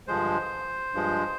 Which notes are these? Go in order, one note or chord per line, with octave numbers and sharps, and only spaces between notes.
G2 D3 F3 G#3 C5
G2 F3 G#3